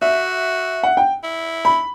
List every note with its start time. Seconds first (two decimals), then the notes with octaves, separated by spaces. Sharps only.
0.02 F#4 E5
0.83 F#5
0.97 G5
1.24 E4
1.65 B5